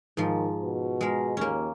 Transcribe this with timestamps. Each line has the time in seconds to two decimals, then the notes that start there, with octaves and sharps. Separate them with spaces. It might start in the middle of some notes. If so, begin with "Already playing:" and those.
0.17 G#2 D#3 F3
0.63 B2
1.01 G#3 A#4
1.37 D#2 A#3 C#4